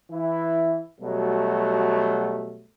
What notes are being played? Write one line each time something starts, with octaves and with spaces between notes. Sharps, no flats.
E3 E4
B2 F#3 G3 A3